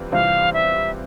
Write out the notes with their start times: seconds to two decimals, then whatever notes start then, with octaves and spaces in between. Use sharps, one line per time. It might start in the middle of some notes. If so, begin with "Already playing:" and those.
Already playing: C3 E3 G3 C4 F4
0.12 C3 E3 G3 C4 F4 F5
0.54 E5